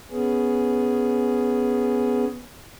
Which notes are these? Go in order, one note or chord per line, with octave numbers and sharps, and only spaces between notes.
B3 C#4 G#4